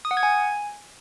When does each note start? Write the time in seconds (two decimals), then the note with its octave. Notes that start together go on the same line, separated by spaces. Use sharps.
0.05 D#6
0.11 F#5
0.17 G#6
0.23 G#5